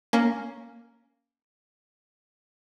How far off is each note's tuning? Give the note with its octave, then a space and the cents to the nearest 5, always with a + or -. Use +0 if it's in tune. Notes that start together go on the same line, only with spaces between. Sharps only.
A#3 +0 C#4 +5